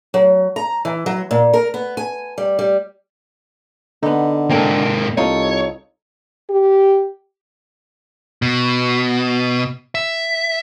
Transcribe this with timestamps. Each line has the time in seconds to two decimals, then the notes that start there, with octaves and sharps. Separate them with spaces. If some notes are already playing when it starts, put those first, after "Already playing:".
0.14 F#3
0.56 A#5
0.85 E3
1.06 F#3
1.31 A#2
1.54 A#4
1.74 B3
1.97 G#5
2.38 G3
2.59 G3
4.03 D3 B3 D#4
4.50 G#2 A#3 C4 A4
5.17 C2 D#4 F4 A4 C#5
6.50 G4
8.42 B2
9.95 E5